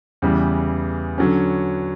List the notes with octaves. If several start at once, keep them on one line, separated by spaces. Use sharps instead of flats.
E2 C#3 E3 G3
D3 F#3 C#4